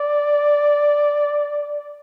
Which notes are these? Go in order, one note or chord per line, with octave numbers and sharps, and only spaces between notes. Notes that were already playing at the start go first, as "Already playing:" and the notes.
Already playing: D5